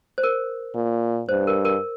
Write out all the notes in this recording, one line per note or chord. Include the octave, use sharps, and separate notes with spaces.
C5
A#4
A#2
G2 C5
A#4
A#4